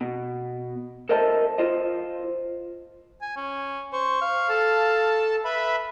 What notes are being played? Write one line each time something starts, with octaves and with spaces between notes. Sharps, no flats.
B2
A4 A#4 C5 D#5 E5 A5
F4 C5 D#5
G#5
C#4
C5 C#6
F5
A4 A5
B4 E5 B5